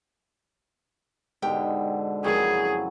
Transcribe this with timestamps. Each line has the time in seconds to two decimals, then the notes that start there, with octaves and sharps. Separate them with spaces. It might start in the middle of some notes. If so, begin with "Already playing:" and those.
1.42 G#2 B2 D3 G4 G5
2.24 F2 C#3 E3 F#3 A#3 G#4